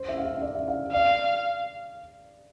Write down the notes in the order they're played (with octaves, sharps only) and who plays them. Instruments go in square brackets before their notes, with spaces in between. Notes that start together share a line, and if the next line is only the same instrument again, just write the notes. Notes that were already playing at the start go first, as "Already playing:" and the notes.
Already playing: [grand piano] C5
E5
F5
E5
E5
D5
E5
F5
[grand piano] D5 [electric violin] F5